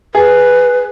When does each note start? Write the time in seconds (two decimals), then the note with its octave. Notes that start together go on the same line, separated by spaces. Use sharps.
0.15 G#4 B4